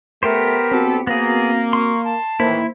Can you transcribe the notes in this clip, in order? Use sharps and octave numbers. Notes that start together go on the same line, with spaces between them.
A3 B3 G4 A#4 C5
A#1 C4 F#4 A4
A#3 B3 G#4 A#6
C6 C#6
A5
A2 D#3 E3 A#3 E4 C5